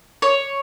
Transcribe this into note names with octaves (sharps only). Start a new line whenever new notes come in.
C#5